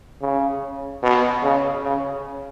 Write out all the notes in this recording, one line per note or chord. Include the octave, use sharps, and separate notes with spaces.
C#3
B2
C#3
C#3